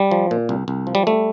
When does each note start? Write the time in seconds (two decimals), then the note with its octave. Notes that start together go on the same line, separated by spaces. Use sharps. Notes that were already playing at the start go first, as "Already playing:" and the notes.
Already playing: G3
0.11 F3
0.31 A#2
0.49 C2
0.68 C2
0.87 F3
0.95 G3
1.07 G3 A3